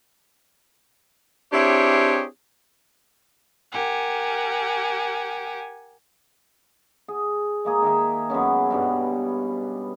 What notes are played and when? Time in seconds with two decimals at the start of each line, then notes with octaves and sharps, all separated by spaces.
1.53 C4 D4 E4 G4 G#4 C#5
3.72 G4 A#4 F#5 G#5
7.08 G#4
7.65 G#3 A#3 G#4
7.82 D#3 A#4 E5
8.30 F#2 G#3 B3 C#4
8.70 G2 B2 G3